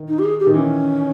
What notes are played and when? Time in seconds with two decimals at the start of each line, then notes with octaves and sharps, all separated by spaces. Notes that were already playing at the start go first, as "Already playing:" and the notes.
Already playing: D#3
0.08 D#4
0.19 G4
0.24 G#4
0.40 G4
0.47 D#3
0.54 E3 C#4